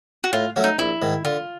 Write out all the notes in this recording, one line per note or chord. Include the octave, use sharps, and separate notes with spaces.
F#4
A2 F4
F#3 A3 C#4 F#4
D#4
A#1 E4
G#2 D#3
D3 F4